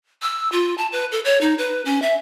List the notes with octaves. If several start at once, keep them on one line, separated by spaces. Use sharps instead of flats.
E6
F4
A5
B4
A4
C#5
D#4
B4
C#4
E5